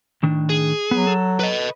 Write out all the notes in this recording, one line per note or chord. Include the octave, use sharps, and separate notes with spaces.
A2 D#3 D4
G#4
F#3 B3
A4
B4 D#5